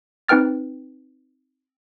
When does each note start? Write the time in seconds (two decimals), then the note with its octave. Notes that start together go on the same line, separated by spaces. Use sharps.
0.29 C4 D#4 B4 G5 F6 A6